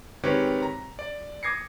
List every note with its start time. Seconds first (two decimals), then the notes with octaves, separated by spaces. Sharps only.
0.24 D#3 G#3 C4 G4 B4 C#5
0.63 A#5
0.99 D5
1.43 D6 D#6 G#6 A#6 C7 C#7